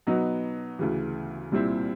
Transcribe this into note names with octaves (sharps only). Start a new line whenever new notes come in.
B2 F#3 B3 D#4 F#4
D2 C#3 E3
C2 A#2 G3 C4 E4